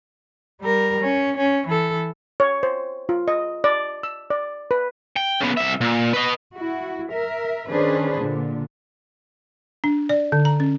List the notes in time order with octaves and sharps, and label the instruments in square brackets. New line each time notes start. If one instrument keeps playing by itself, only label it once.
[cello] G3 A#4
C#4
C#4
E3 A4
[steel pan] C#5
C5
F4
D#5
D5
E6
D5
B4
[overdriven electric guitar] G5
C#3 B3
C2 E5
A#2
B4 D#5
[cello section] E4 F#4
A#4 E5
D#3 C#4 D4 G#4 B4 C5
A#2 D3
[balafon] D4
D5
D3
A#5
C#4